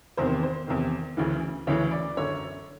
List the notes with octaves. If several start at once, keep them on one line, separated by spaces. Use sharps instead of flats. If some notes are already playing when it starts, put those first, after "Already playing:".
E2 C3 D#3 C5
C5
E2 C3 D#3
D2 C#3 E3
D2 C#3 E3 C#5
D5
F#2 D3 C#5